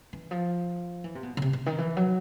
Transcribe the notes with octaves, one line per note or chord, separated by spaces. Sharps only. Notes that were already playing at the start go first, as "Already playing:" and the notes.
E3
F3
E3
C3
B2
C#3
C3
C3
D#3
E3
F#3